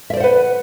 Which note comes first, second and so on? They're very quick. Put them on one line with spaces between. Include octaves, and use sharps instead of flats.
E5 D5 C5 F#5 B4